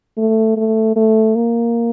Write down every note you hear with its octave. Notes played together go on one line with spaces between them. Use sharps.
A3
A3
A3
A#3